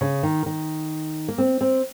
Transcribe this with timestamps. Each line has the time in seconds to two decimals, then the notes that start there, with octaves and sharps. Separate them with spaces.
0.01 C#3
0.23 D#3
0.46 D#3
1.28 A#3
1.38 C4
1.61 C4